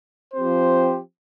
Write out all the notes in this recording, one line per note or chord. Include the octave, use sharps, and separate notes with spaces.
F3 C4 G4 C5